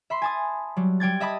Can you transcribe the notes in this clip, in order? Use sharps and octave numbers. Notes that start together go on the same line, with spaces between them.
E5 B5 C6
G#5 A5 D#6
F#3 G3
G3 G5 G#6 A6
D#5 E5 A5 B5 D#6